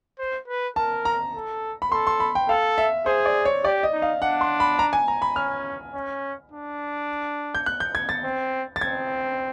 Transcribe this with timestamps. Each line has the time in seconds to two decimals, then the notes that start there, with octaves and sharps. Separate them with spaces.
0.19 C5
0.48 B4
0.76 A#4 A5
1.05 A#5
1.34 A4
1.82 B5
1.92 A4 C6
2.07 C6
2.20 B5
2.35 G5
2.49 A4 F5
2.78 E5
3.06 G#4 C5
3.26 D5
3.45 C#5
3.64 G4 D5
3.83 D#5
3.93 D#4
4.02 F5
4.21 D4 F#5
4.41 C6
4.60 B5
4.79 A#5
4.93 G#5
5.08 A#5
5.22 B5
5.36 C#4 F6
5.94 C#4
6.52 D4
7.55 G6
7.66 F#6
7.80 G6
7.95 G#6
8.09 A6
8.24 C4
8.76 A6
8.81 C4 G#6